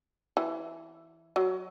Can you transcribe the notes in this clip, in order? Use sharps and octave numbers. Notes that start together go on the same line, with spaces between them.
E3
F#3